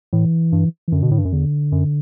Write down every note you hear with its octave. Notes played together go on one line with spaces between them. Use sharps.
A2 E3
G2
E3
F#2 D3
B2
A2
G2
F#2
E2 D3
F#2